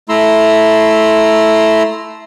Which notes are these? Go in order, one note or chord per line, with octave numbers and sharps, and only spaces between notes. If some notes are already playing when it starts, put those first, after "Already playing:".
A3 E4 A#5 C6 E6